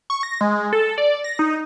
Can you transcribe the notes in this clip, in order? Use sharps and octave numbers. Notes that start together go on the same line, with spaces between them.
C#6
A#6
G#3
A4
D5
A#6
D#4